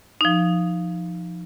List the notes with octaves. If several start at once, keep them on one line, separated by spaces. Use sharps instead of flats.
F3 D#4